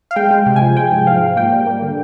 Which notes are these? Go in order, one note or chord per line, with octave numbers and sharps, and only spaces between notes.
F5
G#3 G5
G#3
C3
G#5
F3
G#3 G5
G#2
F3 F5
F3
A#3 G5
G3
A#3
D3